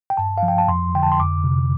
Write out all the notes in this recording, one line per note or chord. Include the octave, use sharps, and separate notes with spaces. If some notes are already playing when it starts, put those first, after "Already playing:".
G5
G2 A5
F5
F3
G5
A5
F2 C6
D3 G5
A5
C6
F2 D6
C3